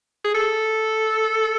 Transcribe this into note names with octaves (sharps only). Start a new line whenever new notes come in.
G#4
A4